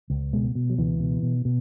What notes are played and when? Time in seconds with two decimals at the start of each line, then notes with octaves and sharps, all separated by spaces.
0.10 C#2
0.33 B2 G#3
0.55 B2
0.70 F#3
0.78 C#2 E3
1.00 B2
1.23 B2
1.45 B2